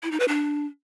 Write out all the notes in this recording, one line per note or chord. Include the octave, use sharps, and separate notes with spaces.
E4
D#4
B4
D4